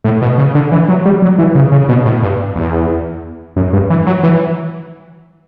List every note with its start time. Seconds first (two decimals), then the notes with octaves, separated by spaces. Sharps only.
0.04 A2
0.22 B2
0.38 C#3
0.55 D3
0.72 E3
0.88 F#3
1.05 G3
1.22 F#3
1.38 E3
1.55 C#3
1.72 C#3
1.89 B2
2.05 A2
2.23 G2
2.56 E2
3.56 F#2
3.73 G2
3.90 E3
4.06 F#3
4.23 E3